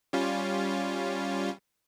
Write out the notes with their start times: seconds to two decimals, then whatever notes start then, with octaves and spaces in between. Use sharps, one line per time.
0.13 G3 C#4 F4